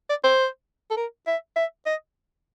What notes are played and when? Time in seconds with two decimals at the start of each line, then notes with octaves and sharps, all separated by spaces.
0.10 D5
0.24 C5
0.91 A4
0.97 A#4
1.27 E5
1.56 E5
1.86 D#5